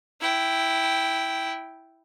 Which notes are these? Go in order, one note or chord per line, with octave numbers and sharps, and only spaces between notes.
E4 G5